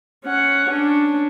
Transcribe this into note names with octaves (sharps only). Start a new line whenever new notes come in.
C#4 F#5
C#4 D4